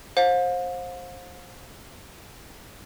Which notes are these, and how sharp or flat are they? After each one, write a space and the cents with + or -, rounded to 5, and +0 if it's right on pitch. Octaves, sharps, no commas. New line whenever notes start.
C5 +20 F5 +40